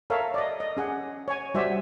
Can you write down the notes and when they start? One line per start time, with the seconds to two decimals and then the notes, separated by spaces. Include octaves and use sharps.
0.10 A4 A#4 C#5 E5 F5
0.34 D5 D#5
0.60 D#5
0.77 C#4 G#4 F#5
1.28 C#5 G#5
1.54 G3 F#4 C5 D5 E5 G#5